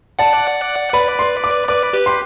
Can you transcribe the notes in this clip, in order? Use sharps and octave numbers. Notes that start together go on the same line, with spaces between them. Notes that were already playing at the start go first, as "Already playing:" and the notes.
D5 F#5 A5
B4 D5 B5
C6
D6
B4 D5 D6
G4 B4
C6